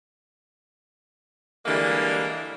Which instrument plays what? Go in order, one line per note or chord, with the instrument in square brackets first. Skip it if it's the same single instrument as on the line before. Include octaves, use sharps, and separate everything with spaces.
[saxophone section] D3 E3 G3 G#3 A#3